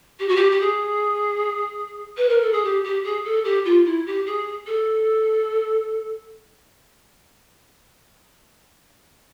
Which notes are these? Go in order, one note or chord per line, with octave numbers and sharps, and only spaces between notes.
G4
F#4
G4
G4
G#4
B4
A#4
A4
G#4
G4
G4
G#4
A4
G4
F4
E4
G4
G#4
A4